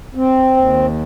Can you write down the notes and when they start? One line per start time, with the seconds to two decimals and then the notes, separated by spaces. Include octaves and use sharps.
0.15 C4
0.56 D#2